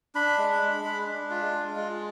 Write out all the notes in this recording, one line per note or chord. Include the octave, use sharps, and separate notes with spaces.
D4 B5
G#3
G#3
G#3
D4
F4
G#3
G#3